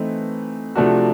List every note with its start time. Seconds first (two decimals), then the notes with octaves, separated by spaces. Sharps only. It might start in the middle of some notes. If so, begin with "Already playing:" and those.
Already playing: E3 A3 C4 D#4
0.76 C3 F3 A3 D4 F#4